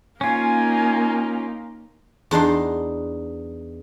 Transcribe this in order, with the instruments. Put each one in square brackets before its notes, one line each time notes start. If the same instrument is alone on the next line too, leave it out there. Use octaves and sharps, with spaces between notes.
[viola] A#3 D#4 [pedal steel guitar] C#4 F4 [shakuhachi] G#5
[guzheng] E2 D4 D#4 C6